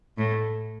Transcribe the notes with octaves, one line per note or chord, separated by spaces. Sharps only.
A2